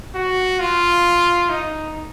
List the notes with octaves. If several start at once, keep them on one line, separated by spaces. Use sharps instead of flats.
F#4
F4
D#4